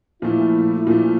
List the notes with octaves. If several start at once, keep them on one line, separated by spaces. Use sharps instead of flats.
A#2 F3 A3 E4
A#2 F3 A3